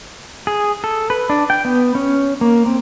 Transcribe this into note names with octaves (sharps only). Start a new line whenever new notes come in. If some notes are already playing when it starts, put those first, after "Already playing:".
G#4
A4
B4
D4
G5
B3
C#4
A#3
C4